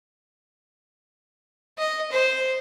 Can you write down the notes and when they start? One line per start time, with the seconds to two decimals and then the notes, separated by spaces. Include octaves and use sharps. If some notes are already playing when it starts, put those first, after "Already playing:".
1.78 D#5
2.12 C5